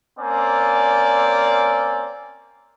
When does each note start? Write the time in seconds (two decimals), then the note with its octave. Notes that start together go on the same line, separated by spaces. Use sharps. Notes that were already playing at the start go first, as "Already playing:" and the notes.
0.20 A#3 C4 C#4 D5